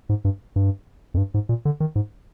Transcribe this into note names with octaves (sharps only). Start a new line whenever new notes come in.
G#2
G2
G2
F2
G2
G#2
A#2
D3
D#3
G#2